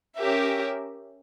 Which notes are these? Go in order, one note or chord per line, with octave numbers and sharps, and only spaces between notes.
C#4 G4 A#4 E5